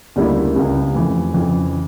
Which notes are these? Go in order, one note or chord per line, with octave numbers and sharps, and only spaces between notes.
D2 C#3 G3 A#3 E4
C#2 C#3 G3 C#4
F2 E3 A3
F2 C#3 E3